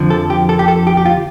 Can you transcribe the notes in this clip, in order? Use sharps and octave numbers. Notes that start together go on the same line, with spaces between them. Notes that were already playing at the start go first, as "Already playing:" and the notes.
Already playing: F2 D3 F3
A4
G4
A4
G4
A4
G4
G4
F4